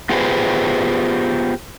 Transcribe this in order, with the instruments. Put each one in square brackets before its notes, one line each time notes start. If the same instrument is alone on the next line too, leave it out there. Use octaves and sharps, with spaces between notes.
[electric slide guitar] B3 F4 G4 G#4 B4 C5